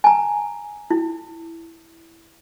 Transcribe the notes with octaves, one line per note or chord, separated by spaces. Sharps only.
G#5 A#5
E4